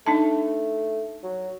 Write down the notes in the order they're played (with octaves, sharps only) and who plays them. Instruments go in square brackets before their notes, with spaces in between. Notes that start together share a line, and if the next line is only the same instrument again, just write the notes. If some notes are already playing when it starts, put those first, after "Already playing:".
[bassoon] A3 [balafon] D4 D#4 A5
[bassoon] F#3